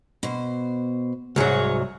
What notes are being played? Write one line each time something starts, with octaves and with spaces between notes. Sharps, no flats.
B2 C5
C2 G#2 F#3 G#4 C#5